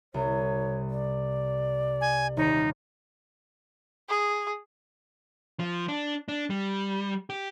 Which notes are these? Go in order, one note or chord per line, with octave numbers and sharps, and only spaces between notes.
C2 C#5
D5
G#5
D#1 D#4 C#5
G#4
F3
D4
D4
G3
G4